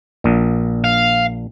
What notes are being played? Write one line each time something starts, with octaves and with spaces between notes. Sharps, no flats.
A#1 A#2
F5